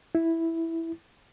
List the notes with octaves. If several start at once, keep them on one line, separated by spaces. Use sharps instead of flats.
E4